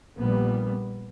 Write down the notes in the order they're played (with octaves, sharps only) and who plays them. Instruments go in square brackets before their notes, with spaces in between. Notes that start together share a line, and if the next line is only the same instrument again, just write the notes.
[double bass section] A#1 A#2 G3 B3